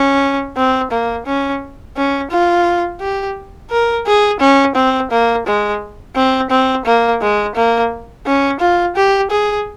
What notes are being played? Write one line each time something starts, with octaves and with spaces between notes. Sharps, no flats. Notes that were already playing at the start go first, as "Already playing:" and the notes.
Already playing: C#4
C4
A#3
C#4
C#4
F4
G4
A#4
G#4
C#4
C4
A#3
G#3
C4
C4
A#3
G#3
A#3
C#4
F4
G4
G#4